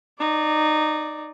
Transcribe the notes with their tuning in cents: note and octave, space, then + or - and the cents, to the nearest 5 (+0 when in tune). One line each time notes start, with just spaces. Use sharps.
D#4 -15 D5 +0